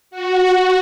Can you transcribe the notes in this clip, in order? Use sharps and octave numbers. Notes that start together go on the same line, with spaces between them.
F#4